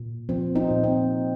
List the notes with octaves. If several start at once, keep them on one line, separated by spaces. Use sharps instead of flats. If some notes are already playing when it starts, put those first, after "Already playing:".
Already playing: A#2
F3 C4
C4 D#4
A#2
C4